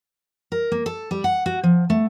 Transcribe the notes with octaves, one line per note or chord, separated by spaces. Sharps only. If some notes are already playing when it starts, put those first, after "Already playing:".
A#4
A#3
A4
G3
F#5
F#4
F3
A3